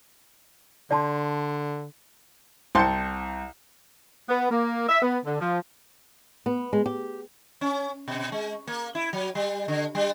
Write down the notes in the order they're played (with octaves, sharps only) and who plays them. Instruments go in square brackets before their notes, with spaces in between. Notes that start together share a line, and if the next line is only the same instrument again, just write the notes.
[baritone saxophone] D3 [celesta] D5 A5 C6
[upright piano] C2 G6 C#7 [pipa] C4 A5 C6
[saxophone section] B3
A#3
E5
B3
D3
F3
[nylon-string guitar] B3
G#3
G4
[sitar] C#4
B2
G#3
A#3
E4
F#3
G3
D3
G3